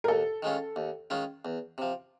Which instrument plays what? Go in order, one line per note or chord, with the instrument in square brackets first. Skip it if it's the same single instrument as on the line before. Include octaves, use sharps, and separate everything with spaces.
[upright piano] A#4
[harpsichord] D#2 [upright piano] A4
[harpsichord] D#3 G#3 C#4 F4
D#2
D#3 G#3 C#4 F4
E2
C3 F3